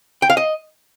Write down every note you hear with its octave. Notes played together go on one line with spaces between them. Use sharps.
G5
F5
D#5